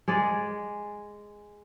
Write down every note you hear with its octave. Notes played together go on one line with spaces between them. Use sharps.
G#3 G#4 D5